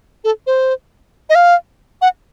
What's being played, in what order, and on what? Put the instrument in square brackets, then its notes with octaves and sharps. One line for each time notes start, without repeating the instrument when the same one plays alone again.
[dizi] A4
C5
D#5
F5
F#5